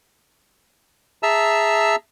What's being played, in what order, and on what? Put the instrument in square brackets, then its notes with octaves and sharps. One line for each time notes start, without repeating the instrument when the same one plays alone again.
[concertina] G#4 E5 A5 A#5 E6